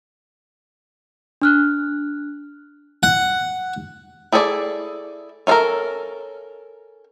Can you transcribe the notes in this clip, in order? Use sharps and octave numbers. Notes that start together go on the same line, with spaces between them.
D4 F6 F#6
F#5
E4 G#4 A4 C#5 D5
C#4 E4 F4 A4 A#4